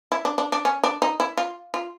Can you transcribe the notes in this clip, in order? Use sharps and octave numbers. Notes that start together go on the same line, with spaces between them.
E4
D4
D4
D4
C#4
D4
D#4
E4
F4
F4